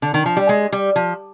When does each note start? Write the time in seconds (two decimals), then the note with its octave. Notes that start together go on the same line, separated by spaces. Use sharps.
0.02 D3
0.14 D#3
0.26 F3
0.37 G3
0.49 G#3
0.72 G3
0.96 F3